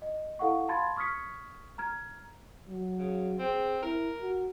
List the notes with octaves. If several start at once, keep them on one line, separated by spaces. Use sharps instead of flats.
D#5
E4 A4 F5 F#5 C#6
F5 A5 B5 C6 G#6 A6
C#6 D#6 F6 G#6 B6 C#7
A#5 F6 G#6
F#3
C#3
C4 G#4
E4 A#4
F#4